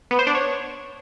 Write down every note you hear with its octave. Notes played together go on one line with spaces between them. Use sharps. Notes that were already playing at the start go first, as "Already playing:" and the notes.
B3
C5
D4
C#5